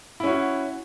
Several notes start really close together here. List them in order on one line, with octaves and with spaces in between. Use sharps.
E4 C#4 F#4